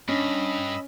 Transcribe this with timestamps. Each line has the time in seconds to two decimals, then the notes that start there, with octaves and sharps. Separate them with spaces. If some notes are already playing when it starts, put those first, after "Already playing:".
0.08 G2 C#4 D4 D#5 B5 E6